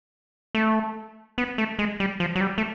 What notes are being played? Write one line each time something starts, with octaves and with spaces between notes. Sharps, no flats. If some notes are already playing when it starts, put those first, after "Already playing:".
A3
B3
A3
G#3
G3
F3
F#3
G3
A3